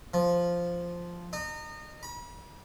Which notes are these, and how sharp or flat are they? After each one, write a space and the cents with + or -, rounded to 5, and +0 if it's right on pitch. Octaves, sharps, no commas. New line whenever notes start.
F3 -5
D#4 -30
B5 -40